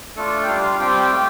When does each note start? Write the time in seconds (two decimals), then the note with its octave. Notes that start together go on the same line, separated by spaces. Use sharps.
0.16 A3 D4 F4 A4
0.43 G5
0.48 G3 D4 F4 F5
0.63 F4 F5
0.79 G3 C4 F4 G4 G5
1.11 A3 F4